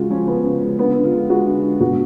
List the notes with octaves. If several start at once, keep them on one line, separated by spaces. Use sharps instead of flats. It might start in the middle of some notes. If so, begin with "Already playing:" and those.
Already playing: C#3 G#3 F4 F#4
F3 C#4
C#3 B3
C#3
G#3
D3 B3
D3
F4
G#3
G#3 F#4
D3
D3
B2 F#4